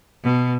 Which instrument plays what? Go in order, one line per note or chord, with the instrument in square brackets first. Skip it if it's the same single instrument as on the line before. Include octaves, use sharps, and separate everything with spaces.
[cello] B2